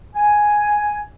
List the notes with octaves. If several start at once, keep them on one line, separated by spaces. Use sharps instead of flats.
G#5